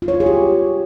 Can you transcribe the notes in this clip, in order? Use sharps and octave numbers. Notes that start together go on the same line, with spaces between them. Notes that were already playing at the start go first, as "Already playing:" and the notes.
F4
C#5
F4
G#4
G4